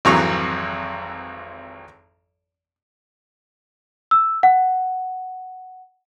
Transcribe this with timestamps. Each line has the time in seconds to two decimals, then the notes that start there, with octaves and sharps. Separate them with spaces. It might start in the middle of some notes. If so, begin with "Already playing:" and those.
0.05 G#1 F2 E3 F#3 A#5 C#6
4.11 E6
4.43 F#5